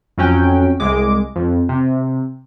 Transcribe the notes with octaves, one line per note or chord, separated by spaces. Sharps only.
F2 F#3 C#4 G5
C2 G#3 D6
F2
C3